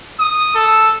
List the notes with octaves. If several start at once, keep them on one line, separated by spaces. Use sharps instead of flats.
D#6
A4